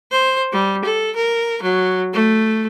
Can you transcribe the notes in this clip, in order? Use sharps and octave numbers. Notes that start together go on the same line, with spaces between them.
C5
G3
A4
A#4
F#3
A3